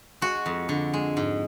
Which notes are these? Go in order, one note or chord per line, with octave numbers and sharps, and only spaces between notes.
G#3 F#4
F2
D3
G#3
G#2